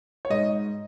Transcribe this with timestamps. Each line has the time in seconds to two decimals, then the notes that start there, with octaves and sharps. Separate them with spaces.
0.25 C#5
0.30 G#2 D#5